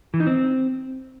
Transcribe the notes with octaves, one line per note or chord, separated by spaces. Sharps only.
E3
D#4
C4